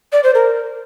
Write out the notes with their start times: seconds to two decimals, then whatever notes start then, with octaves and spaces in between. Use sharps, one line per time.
0.12 D5
0.23 C5
0.34 A#4